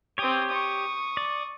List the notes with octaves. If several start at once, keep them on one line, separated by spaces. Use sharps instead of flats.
C4 G4 C#5 D#6
C#6 D#6
D5